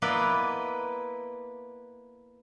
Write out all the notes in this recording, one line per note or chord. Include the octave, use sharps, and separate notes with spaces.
A#3 B3 E4 B4 D5 D#5